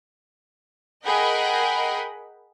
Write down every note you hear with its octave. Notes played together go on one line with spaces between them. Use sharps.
G#4 A#4 D#5 F#5 G5 B5